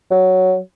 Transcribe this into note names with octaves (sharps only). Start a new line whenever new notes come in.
F#3